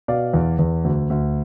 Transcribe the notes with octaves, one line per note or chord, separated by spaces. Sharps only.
B2 D5 F5
E2
E2
D2
D2